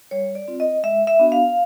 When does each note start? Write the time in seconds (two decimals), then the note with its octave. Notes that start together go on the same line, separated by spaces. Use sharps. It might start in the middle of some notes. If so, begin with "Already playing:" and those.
0.11 G3 C#5
0.35 D5
0.48 C4 F4
0.60 D#5
0.83 G#3 E5
1.07 E5
1.19 B3 D4 F#4
1.32 F5